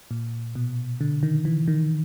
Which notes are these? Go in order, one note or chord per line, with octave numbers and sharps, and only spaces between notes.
A#2
B2
D3
D#3
E3
D#3